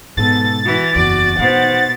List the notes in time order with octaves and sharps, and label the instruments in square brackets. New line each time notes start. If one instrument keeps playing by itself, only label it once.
[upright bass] G#2 B2 [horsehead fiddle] B3 A4 [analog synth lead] A6
[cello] E3 [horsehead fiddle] F#4
[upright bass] F#1 E2 [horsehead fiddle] F#4 [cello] D5
[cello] B2 [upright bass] D#4 [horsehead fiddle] C5 F#5